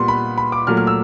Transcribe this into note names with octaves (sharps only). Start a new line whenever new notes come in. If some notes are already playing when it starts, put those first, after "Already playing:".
Already playing: A#2 G3 B3 C6
B5
B5
D6
A#2 F#3 A3 F6
F6
E6